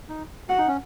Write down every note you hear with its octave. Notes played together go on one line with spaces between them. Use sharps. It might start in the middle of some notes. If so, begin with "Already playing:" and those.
D#4
F#4 F#5
D#4
C#4